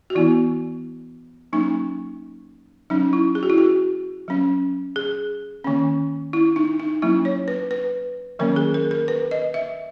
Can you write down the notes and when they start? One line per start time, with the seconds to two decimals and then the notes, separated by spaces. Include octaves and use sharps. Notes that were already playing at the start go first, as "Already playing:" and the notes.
0.10 F#4
0.15 E3 B3 E4
1.53 F#3 A#3 C#4 D#4
2.90 F#3 C#4 D#4
3.13 E4
3.35 G#4
3.43 F#4
3.50 E4
3.58 F#4
4.28 F#3 C#4
4.96 G#4
5.64 D#3 A#3 C#4
6.33 E4
6.56 D#4
6.80 D#4
7.02 F#3 A#3 C#4 E4
7.25 C#5
7.48 B4
7.71 B4
8.39 D#3 F#3 A#3 C#4 A#4
8.56 G#4
8.74 A#4
8.91 A#4
9.08 B4
9.31 D#5
9.54 E5